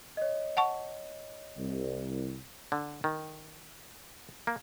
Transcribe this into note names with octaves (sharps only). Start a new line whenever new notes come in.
C#5 D#5
F#5 A5 C#6
C2
D3
D#3
A#3